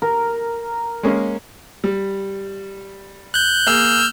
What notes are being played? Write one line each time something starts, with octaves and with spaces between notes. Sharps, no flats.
A#4
G#3 A#3 C#4
G3
F#6 G6
A#3 G#4 E6 F6 G6